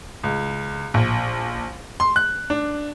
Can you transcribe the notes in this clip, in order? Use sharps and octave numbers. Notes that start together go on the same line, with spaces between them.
C#2
A#1
C6
F#6
D4